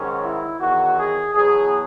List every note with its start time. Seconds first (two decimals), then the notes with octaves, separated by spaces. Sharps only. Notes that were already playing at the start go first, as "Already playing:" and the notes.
Already playing: G#2 D#3 F#3 C#4
0.22 E4
0.59 E2 D#3 F#3 F#4
0.98 G#4
1.35 E2 B2 F#3 G#4